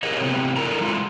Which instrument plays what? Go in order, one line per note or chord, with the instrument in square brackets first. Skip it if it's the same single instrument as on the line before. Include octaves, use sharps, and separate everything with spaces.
[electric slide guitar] G4 G#4 A#4 C#5 D#5
C3 E3 A3 B3 G4
E2 D4 E4 A4 A#4 A#5
G#3 A3 E4 F4